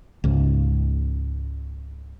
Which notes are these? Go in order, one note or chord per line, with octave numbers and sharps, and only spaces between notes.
C#2 G#2